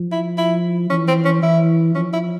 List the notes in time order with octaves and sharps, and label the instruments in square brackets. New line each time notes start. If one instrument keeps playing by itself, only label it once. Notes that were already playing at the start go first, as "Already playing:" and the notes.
Already playing: [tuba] F3
[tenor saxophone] E4
E4
[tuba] E3 [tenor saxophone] C#4
[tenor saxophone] C4
C#4
[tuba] E3 [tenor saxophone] E4
[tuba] F3 [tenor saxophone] C#4
[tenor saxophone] E4